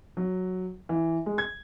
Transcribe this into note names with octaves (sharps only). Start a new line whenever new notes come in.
F#3
E3
G#3
G#6